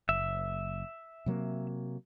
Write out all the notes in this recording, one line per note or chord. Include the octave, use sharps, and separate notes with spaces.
F#1 E5
C3 F#3 A#3